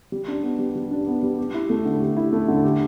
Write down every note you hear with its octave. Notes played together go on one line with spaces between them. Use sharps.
G3
D4
B3
G3
G3
D4
B3
G3
G4
E4
A3
D3
G4
E4
A3
D3
G4